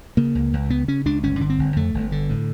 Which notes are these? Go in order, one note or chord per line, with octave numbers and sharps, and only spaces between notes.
C#3 A#3
C#2
C#2
C#3 B3
C#3 C#4
C#2 D4
G1 C#4
D3
C4
G1
F2 A3
G1
D3
A2